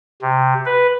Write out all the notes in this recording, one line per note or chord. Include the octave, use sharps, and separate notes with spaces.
C3
B4